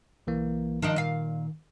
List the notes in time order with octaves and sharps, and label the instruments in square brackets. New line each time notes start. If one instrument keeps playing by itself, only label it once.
[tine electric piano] B1 E3 A#3
[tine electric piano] D#3 [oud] F3 D4 D#4
[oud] A#2 F5